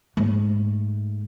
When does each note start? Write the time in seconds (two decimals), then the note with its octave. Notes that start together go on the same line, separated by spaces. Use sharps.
0.17 G#2 A3